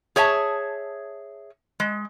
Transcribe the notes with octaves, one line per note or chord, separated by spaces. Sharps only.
G#4 C#5 E5 G#5 A5
G#3